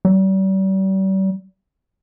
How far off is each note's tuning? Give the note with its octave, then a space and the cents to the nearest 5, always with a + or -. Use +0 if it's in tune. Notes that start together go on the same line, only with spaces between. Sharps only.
G3 -40